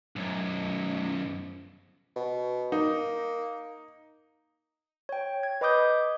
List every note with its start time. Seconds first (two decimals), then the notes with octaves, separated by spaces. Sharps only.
0.16 B1 F#2
2.16 B2
2.72 A#3 D#4
5.09 C#5 G5
5.43 G#6
5.61 B4 D#5 B5 D6 D#6 G6